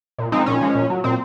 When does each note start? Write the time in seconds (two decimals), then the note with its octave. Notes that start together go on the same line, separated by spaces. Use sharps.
0.19 A#2
0.32 F3 G#3 C4 D#4
0.46 A#2 C#4
0.61 F3 G#3
0.75 A#2
0.90 F#3
1.04 A#2 C4